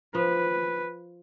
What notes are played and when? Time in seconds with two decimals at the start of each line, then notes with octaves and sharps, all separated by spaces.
0.15 F3 B4